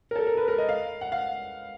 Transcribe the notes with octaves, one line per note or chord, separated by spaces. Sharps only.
A#4
A4
A#4
B4
A#4
D#5
F5
F#5
F5